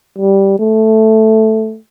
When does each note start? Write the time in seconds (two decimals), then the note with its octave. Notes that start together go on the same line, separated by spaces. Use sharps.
0.19 G3
0.59 A3